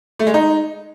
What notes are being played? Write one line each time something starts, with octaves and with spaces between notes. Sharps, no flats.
A3
G#3
D#4